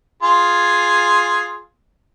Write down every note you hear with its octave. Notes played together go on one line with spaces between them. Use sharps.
F4 G#4